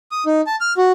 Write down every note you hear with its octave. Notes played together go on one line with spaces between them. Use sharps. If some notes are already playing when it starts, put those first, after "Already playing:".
D#6
D#4
A5
F6
F#4